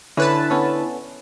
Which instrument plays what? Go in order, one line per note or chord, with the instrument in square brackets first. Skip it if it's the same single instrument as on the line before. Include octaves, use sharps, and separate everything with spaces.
[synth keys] D3 B4 A5 [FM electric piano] C#4 [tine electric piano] E4
[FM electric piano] B3 C#4 A4